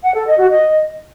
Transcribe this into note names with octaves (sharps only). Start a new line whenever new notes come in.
F#5
A4
D#5
F#4
D#5